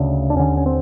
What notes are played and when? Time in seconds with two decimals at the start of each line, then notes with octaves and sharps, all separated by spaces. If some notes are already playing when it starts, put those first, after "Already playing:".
Already playing: D2 C#3 D4
0.30 D4
0.36 D#2 D3 C#4
0.57 C#4
0.66 C4